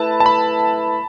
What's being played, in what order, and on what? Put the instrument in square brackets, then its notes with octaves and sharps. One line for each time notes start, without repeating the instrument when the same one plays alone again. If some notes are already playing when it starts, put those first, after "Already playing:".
Already playing: [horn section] A3 E4 B4 [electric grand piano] A5 B5
[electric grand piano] A5
B5